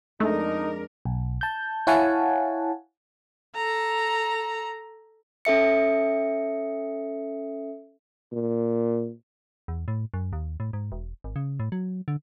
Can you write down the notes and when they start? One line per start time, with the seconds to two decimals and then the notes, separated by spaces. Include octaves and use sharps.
0.20 F2 G#3 A3 D4 D#4 A#4
1.05 B1
1.41 A5 G6
1.87 E4 C#5 F5 F#5 G#5 A5
3.55 A4 A#5
5.45 C#4 A4 E5 C#7
8.33 A#2
9.68 E2
9.88 A2
10.14 F#2
10.33 D#2
10.60 A2
10.73 G#2
10.92 E1
11.24 G#1
11.36 C#3
11.60 A2
11.72 F#3
12.08 D3